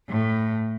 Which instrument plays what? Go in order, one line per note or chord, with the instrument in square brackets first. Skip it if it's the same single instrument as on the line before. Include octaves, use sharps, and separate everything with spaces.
[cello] A2